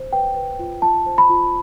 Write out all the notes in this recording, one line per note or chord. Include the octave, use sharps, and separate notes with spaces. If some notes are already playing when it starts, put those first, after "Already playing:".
Already playing: C5
B4 G5
B4
F4
F4 A5
C5
B5
F4